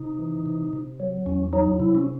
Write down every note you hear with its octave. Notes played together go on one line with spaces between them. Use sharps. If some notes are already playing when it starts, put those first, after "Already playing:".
Already playing: C3 D#4
E3
C3
C3
F#3
E2 C#4
F#3 D#4
C3 E4
C#4